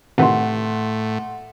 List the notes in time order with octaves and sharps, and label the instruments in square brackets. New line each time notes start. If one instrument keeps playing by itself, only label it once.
[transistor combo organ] A2 [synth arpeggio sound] C3 D#3 E3 [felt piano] F#5 C6